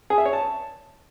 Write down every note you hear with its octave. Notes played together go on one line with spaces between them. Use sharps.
G#4
E5
C#5
A5